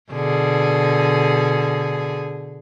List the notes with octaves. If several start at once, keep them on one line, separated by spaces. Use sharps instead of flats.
B2 D3 G#4